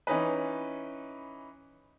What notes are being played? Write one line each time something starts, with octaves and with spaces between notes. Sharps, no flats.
E3 C#4 D#4 B4